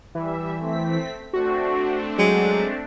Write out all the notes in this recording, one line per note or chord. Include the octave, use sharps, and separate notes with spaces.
E3 G3 E5
A3 C4 B6
A3 C4 D4 F#4
F#3 G#3